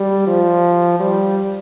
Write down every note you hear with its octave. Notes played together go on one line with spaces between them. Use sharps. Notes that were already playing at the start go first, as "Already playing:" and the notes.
Already playing: G3
F3
G3